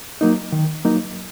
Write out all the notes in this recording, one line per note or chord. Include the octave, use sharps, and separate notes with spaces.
F#3 A#3 D#4
D#3
F#3 A#3 D#4